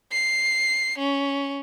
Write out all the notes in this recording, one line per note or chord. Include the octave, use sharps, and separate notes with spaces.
C7
C#4